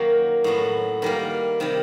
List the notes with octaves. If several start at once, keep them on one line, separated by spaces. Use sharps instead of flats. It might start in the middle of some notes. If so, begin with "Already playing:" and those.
Already playing: F#2 D#3 F#3 A#3
A2 F#3 B3
D#3 G3 A#3
C3 D#3 G3